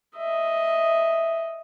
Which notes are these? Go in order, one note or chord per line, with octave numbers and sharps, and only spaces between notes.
D#5 E5